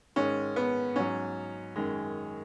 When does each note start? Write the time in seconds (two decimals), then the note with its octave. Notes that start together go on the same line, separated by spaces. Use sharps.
0.16 G#2 D#3 G#3 C#4
0.56 B3
0.96 G#2 F#3 C#4
1.76 F#2 D#3 G#3